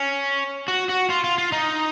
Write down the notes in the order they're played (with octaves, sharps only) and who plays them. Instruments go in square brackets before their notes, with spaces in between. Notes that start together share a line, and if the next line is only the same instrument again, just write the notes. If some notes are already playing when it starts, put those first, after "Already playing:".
Already playing: [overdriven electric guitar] C#4
F#4
F#4
F4
F4
F4
D#4